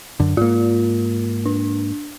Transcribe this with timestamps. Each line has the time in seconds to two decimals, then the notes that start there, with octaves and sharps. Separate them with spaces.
0.20 F#2 D3
0.37 G#2 A#3 F4
1.46 D4